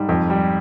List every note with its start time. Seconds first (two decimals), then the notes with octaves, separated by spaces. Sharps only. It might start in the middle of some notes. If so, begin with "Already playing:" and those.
Already playing: G#2 G3
0.09 F2
0.30 G3